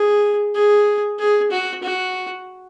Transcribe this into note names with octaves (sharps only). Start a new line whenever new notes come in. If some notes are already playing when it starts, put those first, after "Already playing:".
Already playing: G#4
G#4
G#4
F#4
F#4